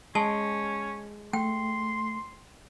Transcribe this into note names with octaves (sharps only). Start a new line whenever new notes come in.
G#3 C#4 G#5 A5
A3 G5 C6